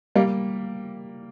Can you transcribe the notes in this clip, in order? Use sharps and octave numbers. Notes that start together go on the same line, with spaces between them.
G3 A#3